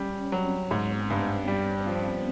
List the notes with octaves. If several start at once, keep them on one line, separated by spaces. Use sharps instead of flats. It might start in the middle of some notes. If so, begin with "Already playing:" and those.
Already playing: G3 C#4
F#3 C4
G#2 B3
G2
G3
F3